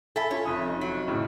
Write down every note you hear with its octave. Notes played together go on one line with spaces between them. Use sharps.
A4 E5 G#5 B5
C#4 F4 C#5
F1 D#6
D#4
F#3
G#1 A2 C#3